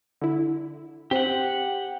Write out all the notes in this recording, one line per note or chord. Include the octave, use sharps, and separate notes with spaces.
D3 E4
C4 G4 C5 F#5